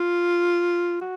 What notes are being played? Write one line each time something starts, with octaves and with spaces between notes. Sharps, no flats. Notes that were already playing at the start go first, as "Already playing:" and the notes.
Already playing: F4
F#4